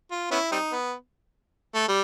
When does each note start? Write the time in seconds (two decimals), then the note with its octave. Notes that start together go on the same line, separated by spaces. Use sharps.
0.11 F4
0.31 B3 C#4 E4
0.52 G3 C4 D#4
0.72 B3
1.75 A3
1.88 G3